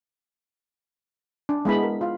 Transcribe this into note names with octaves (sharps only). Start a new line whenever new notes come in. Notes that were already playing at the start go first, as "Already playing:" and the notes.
D4
G#3 B3 E4 B5
A#4
F4 F5